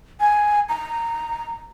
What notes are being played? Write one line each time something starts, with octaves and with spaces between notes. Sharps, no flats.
G#5
A#5